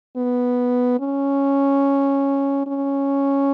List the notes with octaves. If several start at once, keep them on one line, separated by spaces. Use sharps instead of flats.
B3
C#4
C#4